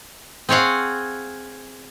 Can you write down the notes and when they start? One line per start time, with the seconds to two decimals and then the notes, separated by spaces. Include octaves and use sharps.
0.49 C4 G#4 C#5 F5 F#5